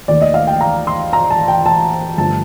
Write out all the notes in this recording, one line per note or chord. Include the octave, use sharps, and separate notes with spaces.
D#2 D#3 A3 D5
D#5
F5
G5
A#5
C6
A#5
A5
G5
A5
G2 D3 F3 A3 A5